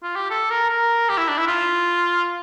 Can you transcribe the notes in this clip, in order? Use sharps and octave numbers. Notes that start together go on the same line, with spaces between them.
F4
G4
A4
A#4
A#4
G4
E4
D4
E4
F4